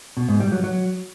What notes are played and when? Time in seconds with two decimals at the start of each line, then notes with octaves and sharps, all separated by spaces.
0.17 B2
0.28 G#2
0.40 G3
0.52 F#3
0.64 F#3